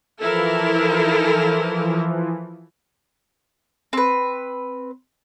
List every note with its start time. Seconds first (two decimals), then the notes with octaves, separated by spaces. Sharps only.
0.21 E3 F3 E4 A4 A#4
3.93 C4 B4